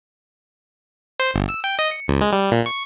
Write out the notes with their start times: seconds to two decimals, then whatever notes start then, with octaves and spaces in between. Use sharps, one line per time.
1.20 C5
1.34 G1
1.49 E6
1.64 G5
1.79 D#5
1.91 C#7
2.08 C#2
2.21 G#3
2.33 G3
2.52 A#2
2.66 C#6